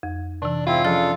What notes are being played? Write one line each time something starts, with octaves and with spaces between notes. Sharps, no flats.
F2
C3 E3 D4
G#2 C4 E4 F4
C#3 F3 D4 A4 F6 A6